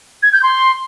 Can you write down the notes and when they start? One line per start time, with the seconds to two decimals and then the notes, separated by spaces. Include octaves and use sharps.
0.23 G#6
0.33 G6
0.43 C6